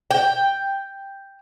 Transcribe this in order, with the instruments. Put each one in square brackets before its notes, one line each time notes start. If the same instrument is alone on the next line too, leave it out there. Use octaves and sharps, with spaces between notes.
[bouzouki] G5